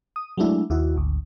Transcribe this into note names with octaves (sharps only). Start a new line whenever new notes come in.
D#6
F#3 G#3 A3 D4 E4
D#2 E4 F#4
G#1 D2